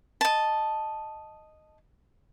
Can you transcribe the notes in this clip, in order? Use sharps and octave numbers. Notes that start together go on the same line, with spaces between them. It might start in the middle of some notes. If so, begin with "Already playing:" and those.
D#5 A5